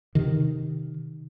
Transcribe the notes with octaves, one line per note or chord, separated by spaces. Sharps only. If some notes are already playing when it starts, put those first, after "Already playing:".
C3 D#3